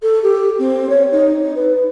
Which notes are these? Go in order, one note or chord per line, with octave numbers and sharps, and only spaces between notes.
A4
G4
C4
C#5
D#4
D#4
B4